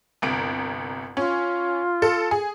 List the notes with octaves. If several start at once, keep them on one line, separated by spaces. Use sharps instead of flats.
G1 C2 D7
C#4 F4
A4
G#4